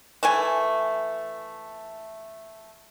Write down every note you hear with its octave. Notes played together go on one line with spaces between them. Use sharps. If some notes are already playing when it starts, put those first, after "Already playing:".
E3 A3 G#5